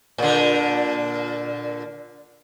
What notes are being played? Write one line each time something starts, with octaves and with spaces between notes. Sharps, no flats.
A#2 D3